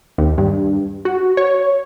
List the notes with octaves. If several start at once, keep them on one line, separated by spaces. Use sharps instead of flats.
D#2
G2
F#4
C#5